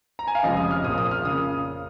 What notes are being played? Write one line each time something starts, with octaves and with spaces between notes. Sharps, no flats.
A#5
G#5
F5
F1 F2 C#3 F3 G#3 D#5
D#6
F6
A#1 A#2 A#3 D#6
D#6
F6
C#3 A#3 D#6